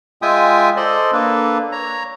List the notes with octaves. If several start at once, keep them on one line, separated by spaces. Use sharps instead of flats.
G#3 F4 E5 G5 G#5 D#6
A4 C5 D5 D#5
A#3 D4 A4 B4
C#5 A#5